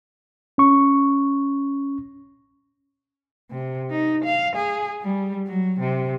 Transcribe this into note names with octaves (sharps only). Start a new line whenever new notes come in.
C#4 C#6
C3
D#4
F5
G#4
G3
F#3
C3